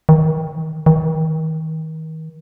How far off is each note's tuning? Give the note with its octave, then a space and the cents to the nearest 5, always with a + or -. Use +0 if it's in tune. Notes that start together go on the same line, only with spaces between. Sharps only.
D#3 +25
D#3 +35